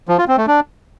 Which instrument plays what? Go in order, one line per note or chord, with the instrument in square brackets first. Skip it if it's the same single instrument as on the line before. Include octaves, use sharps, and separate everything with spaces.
[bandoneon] F3
F4
C4
A3
D4